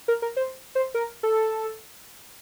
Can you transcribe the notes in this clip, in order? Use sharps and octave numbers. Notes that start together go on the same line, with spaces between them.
A#4
A#4
C5
C5
A#4
A4